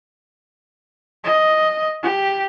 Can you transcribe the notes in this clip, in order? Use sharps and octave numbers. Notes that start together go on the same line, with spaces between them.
D#5
G4